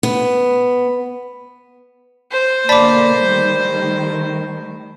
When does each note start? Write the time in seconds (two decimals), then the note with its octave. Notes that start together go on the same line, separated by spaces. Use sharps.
0.03 B3
2.32 C5
2.69 B2 D3 A#3 D5 A5 B5 D6 B6
3.24 D#3 G3 A3